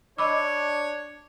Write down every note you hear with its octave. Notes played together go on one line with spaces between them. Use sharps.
D4 C#5 D#5 B5 D6 E6